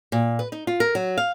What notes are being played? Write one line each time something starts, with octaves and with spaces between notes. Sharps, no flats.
A#2
B4
D#4
F4
A#4
F#3
F5